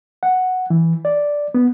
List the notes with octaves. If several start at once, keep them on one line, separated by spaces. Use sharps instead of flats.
F#5
E3
D5
B3